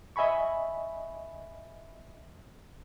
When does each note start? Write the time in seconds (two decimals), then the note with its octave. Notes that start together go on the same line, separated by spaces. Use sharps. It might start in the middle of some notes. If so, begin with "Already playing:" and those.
0.16 D#5 E5 G#5 B5 C#6